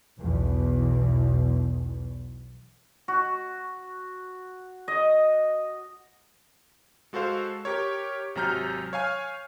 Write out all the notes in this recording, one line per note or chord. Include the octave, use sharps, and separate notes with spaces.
B1 E2 B2
F#4
D#5
G#3 F#4 A4 C5 F5
G4 A#4 C#5
G#1 C3 F#3 A#5 F6 G6
C#5 F5 G#5 F6